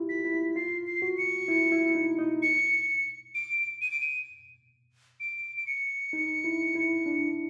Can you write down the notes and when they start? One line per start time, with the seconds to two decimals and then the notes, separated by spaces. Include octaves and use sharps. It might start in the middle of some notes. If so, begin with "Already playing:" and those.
Already playing: E4 F4 G4
0.09 B6
0.25 E4
0.56 F4 C7
0.87 C7
1.02 F#4
1.18 C#7
1.48 E4
1.72 E4
1.95 D#4
2.19 D#4
2.42 C#7
3.34 D7
3.81 D#7
3.91 D7
4.00 D#7
5.20 D7
5.57 D7
5.66 C#7
6.13 D#4
6.44 E4
6.75 E4
7.06 D4